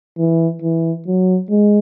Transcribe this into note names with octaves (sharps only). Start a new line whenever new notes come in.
E3
E3
F#3
G#3